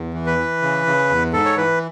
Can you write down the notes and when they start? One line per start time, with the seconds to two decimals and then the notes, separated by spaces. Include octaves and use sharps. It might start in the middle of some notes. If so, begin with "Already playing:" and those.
Already playing: E2
0.14 E3
0.27 B4
0.38 E3
0.62 C#3
0.86 C#3
1.09 E2
1.33 G#2 A4
1.45 C#5
1.57 E3 B4